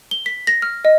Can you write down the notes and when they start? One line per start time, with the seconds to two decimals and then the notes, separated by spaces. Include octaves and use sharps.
0.11 G7
0.26 B6
0.47 A#6
0.62 F6
0.85 D#5